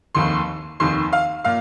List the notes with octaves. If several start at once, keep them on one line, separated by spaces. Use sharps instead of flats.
F1 D#2 D#3 C6
F1 D#2 D#3 C6
F5
A#2 F5